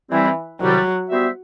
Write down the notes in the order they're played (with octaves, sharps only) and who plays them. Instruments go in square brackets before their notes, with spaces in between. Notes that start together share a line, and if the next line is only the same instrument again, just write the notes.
[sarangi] E3 [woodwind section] G3 C4 E4
[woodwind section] C2 C3 D#3 G3 [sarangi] F#3
[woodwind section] G3 B3 F#4 C5 E5